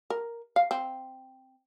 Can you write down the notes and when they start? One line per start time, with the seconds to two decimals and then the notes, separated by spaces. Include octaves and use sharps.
0.10 A#4
0.56 F5
0.71 C4